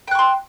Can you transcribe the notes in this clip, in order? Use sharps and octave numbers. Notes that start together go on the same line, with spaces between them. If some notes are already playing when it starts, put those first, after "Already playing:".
G5 C6 C#6 F#6